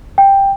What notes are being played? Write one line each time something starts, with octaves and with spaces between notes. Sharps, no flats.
G5